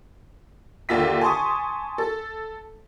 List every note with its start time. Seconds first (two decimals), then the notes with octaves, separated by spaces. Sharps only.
0.89 D#2 D3 F4 E5 B6
1.21 G#5 A5 C6 C#6 D#6
1.98 A4